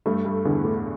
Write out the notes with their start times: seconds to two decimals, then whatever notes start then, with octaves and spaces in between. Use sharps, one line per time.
0.06 G2 A3
0.25 G2
0.45 E2 D3
0.65 A2